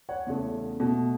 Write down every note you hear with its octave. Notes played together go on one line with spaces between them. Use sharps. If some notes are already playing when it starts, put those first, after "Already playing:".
C#5 F#5
E2 C#3 A3
B2 A3